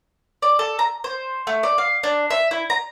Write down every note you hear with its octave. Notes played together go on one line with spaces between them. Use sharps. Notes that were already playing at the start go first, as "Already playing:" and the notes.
D5
A4
A#5
C5
A3
D5
F5
D4
E5
E4
A#5